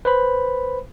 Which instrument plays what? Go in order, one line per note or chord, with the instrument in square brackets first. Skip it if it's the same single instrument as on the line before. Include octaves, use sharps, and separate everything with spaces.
[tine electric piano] B4 C5 B5